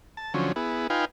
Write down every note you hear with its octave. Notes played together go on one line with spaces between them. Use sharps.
A5
D3 F3 F#3 C#4
B3 E4 G#4
D#4 F4 B4 F5 G5 G#5